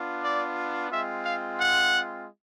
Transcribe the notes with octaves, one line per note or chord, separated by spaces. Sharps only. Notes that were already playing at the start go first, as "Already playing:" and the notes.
Already playing: B3 D4 F4
D5
G#3 C4 F4 E5
F5
F#5